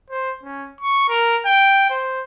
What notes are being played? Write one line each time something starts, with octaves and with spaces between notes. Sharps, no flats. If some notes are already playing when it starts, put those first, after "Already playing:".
C5
C#4
C#6
A#4
G5
C5